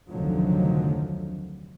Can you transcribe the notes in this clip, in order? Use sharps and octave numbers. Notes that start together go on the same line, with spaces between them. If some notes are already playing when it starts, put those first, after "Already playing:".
F1 D2 D3 D#3 F3 F#3